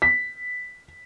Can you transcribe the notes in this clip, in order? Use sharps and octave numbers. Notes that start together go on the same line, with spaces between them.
B6